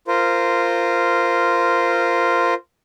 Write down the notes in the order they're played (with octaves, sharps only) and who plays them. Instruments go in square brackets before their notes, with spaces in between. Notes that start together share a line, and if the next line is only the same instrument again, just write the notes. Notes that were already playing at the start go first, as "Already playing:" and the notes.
[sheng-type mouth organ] F4 A#4 C5